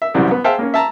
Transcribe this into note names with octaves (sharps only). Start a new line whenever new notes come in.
E5
C2 F#2 E3 G3 C4
B3
G#4 C5 E5 F5 G5 A5
A#3 C#4
E5 A5 A#5